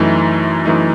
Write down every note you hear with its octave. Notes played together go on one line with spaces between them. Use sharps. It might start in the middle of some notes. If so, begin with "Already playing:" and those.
Already playing: F#2 E3 A3 D#4
F#2 E3 A3 D#4